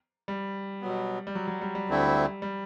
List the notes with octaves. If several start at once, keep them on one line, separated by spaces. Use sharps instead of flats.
G3
B2 F#3 B3
G3
F#3
F#3
G3
G3
D2 D3 A3 C4 E4
G3